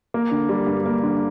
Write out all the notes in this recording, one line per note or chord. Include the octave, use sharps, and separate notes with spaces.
A#3
D3
G3
G2
A#3
D3